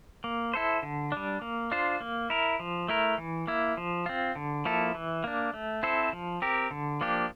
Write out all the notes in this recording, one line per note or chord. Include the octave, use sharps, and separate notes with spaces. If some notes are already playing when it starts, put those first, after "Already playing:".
A#3
E4 A4 C5
D3
G3 D4
A#3
D4 F4 C5
A#3
E4 A#4
F3
A3 E4 A#4
E3
A#3 E4
F3
C4 F4
D3
F3 A#3 E4 A4
E3
A#3 D4
A3
C4 E4 A4 C5
F3
C4 G4 A#4
D3
F3 A#3 D4 G4